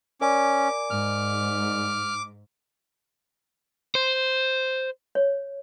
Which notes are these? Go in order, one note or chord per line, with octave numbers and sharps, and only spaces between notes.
C#4 A#4 D5 G#5 D6
G#2 F6
C5
C#5